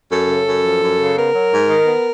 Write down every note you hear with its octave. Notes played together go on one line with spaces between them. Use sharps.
F#2 A4
C#3
F#2
F3
F#2
C#3
B3 A#4
F#3
G#2
D#3
B3